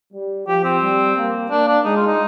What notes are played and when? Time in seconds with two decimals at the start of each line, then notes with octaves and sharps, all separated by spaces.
0.13 G3
0.47 F3 G4
0.64 C4
0.82 G3
1.16 A#3
1.50 A#3 D4
1.68 D4
1.84 G#3 D#4
1.96 F4
2.07 D#4